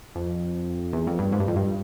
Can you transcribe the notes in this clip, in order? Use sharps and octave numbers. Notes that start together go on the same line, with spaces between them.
F2
E2
F2
G2
G#2
G2
F2
G2